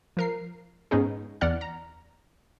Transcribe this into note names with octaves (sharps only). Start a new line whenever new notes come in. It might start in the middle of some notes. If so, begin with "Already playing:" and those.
F3 A#4 C7
G#2 B3 C#4 D#4 G#4
E2 D5 F#5 F6
A#5